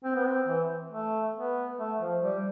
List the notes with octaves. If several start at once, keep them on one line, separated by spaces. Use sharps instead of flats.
C4
B3
C4
E3
A3
B3
A3
F3
G3